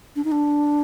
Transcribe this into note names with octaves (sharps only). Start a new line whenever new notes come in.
D4
D#4
D4